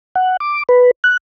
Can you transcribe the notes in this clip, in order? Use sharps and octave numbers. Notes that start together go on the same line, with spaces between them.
F#5
D6
B4
F#6